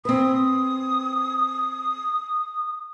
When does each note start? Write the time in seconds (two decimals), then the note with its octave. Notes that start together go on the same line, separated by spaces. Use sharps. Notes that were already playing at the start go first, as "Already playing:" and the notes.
0.05 C4 B4 D#6